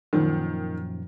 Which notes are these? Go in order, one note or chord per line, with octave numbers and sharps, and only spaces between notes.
F#2 A#2 D#3 F3